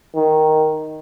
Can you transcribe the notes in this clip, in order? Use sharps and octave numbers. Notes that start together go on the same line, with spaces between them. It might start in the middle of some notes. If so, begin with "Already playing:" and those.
D#3